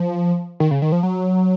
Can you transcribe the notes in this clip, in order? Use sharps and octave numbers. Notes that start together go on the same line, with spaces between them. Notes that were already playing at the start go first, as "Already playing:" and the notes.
Already playing: F3
D#3
C#3
D#3
F3
F#3